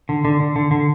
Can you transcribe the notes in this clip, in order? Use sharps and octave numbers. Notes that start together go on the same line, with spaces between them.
D3
D3
D3
D3
D3